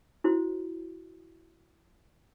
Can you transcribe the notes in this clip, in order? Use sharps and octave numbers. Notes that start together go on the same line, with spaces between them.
E4 F#4 C5